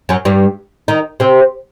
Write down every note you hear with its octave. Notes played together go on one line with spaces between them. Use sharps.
F#2 F#3
G2 G3
D#3 D#4
C3 C4